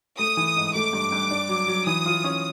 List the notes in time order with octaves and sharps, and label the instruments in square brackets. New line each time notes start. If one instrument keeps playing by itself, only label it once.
[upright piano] A3 [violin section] D#6
[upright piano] E3
G#2
[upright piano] A3 [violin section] D6
[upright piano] G2
G2
D4
F#3
F#3
[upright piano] E3 [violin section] D#6
[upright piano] F4
C#4